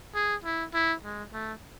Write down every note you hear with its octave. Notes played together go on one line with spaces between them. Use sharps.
G#4
E4
E4
G#3
A3